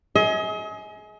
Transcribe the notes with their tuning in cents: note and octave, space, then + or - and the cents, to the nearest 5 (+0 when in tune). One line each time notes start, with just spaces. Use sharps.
G#4 +20 D#5 +40